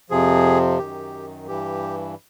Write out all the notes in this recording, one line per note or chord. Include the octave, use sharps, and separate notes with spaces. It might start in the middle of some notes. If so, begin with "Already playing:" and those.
F2 C3 F3 G#4
F#2 D#3 G4
G2 E3 G4